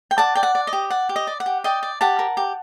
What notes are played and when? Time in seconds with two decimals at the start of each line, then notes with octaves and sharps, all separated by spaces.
0.11 G5
0.18 D5 F#5 A5
0.35 D5 G5
0.43 F#5
0.55 D5
0.67 D#5
0.73 G4
0.90 D5 F#5
1.09 G4
1.16 D#5
1.27 D5
1.40 F#5
1.46 G4
1.64 D5 D#5 G5
1.83 D5
2.01 G4 F#5 A5
2.19 A#4
2.37 G4